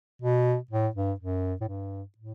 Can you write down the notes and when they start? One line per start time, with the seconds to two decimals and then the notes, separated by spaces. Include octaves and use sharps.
0.22 B2
0.71 A2
0.95 G2
1.20 F#2
1.61 A2
1.68 G2
2.18 A2